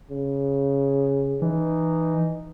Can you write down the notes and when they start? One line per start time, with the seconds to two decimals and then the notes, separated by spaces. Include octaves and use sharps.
0.11 C#3
1.42 E3 D#4